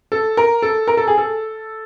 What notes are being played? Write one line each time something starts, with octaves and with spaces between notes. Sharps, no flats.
A4
A#4
A4
A#4
A4
G#4
A4